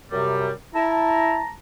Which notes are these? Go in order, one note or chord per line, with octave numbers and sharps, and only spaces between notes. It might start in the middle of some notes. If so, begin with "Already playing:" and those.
F#2 C3 G3
E4 A5 A#5